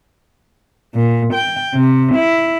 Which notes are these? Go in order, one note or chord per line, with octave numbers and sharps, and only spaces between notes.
A#2
G5
C3
E4